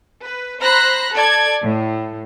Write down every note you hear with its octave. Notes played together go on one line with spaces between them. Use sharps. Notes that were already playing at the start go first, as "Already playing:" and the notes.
B4
C5 A#5 B5 F#6 A#6
A4 D5 G#6
A2